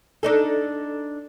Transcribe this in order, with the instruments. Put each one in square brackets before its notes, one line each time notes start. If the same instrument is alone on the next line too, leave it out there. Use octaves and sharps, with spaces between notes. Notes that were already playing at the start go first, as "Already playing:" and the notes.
[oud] D4 D#4 A4